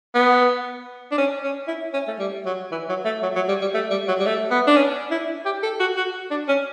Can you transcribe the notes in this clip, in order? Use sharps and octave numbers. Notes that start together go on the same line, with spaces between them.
B3
D4
C#4
C#4
E4
C#4
A3
G3
F#3
E3
F#3
A3
F#3
F#3
G3
G3
A3
G3
F#3
G3
A3
B3
D4
C#4
E4
G4
A4
F#4
F#4
D4
C#4